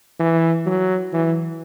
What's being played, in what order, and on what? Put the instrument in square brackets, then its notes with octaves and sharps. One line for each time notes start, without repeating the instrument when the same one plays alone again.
[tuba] E3
F#3
E3